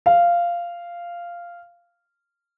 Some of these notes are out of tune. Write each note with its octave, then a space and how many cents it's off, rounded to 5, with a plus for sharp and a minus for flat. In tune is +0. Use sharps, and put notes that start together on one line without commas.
F5 -10